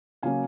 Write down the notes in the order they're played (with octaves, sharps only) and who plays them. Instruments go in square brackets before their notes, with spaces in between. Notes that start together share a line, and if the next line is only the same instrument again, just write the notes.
[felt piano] C#3 F#3 A#3 C#4 F5 G#5